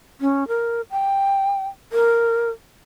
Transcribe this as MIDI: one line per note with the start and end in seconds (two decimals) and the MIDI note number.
0.21 0.47 61
0.48 0.81 70
0.91 1.67 79
1.92 2.49 70